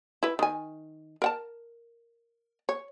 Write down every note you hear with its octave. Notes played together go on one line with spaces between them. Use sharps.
E4 B4
D#3 G#5
A#4 F#5 A5
C#5